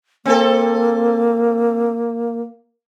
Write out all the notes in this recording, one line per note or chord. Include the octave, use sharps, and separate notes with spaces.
A#3 C4 A4